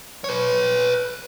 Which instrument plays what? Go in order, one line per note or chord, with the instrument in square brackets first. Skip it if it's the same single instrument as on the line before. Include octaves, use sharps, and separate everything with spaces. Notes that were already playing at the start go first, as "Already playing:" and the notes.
[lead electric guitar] B4 C#5